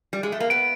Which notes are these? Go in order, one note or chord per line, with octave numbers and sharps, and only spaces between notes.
G3
G#3
A3
A#3
B3 D7